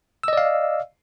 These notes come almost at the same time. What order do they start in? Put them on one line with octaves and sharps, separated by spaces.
E6 D#5 D5 F5